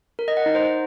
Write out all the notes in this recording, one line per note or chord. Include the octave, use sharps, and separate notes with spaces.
A#4
D#5
F#5
D#4
C5